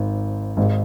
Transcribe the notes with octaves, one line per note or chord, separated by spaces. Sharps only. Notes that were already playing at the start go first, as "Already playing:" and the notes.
Already playing: G#1 G#2
G#1 G#2